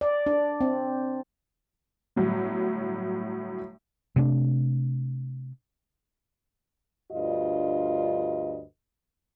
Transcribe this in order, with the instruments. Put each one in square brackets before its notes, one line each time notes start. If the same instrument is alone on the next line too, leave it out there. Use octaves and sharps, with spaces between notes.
[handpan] D5
D4
C4
[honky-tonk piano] G1 A2 F#3 G3
[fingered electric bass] C3 A3 C4 D4
[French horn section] D2 G2 F4 D#5